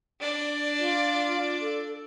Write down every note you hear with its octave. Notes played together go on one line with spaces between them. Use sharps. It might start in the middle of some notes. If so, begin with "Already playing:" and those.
D4 D5
F4
A4